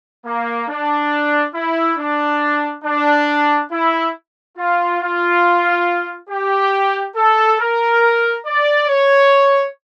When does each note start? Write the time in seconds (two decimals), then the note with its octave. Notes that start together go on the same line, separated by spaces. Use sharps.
0.25 A#3
0.69 D4
1.54 E4
1.98 D4
2.85 D4
3.71 E4
4.57 F4
5.01 F4
6.30 G4
7.16 A4
7.60 A#4
8.46 D5
8.89 C#5